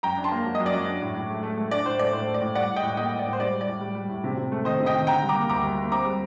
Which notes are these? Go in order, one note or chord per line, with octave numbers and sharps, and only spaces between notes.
F#2 G5 A#5
D4
A5 C6
A#3
F#3
D#5
F#2
D5
F#3
D4
A2
A2
A3
A3
A3
D4 D5
A2 C5
A3 D5
A2 C5
A3
D5
A2
G3 D5 F#5
A2
D#5 G5
A2
A#3 D#5 G5
A2
D5
A2
C5
G3 D5
G3
D5
A2
G3
G3
A2
C3
C3
A3
D#3 C5 D#5
C3
D#5 G5
D#3
D3 G5 A#5
G3
A#5 D6
A#3
D2 A#5 D6
G3
A#3
C4 A#5 D6
G3